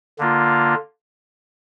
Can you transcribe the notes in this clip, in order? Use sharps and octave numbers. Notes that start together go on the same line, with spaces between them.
D3 A#3 F4